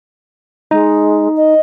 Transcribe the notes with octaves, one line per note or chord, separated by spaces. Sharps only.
G#3 D#4
D#5